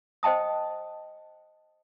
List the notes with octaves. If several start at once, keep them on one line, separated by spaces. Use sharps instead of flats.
C5 D#5 G5 A5 D#6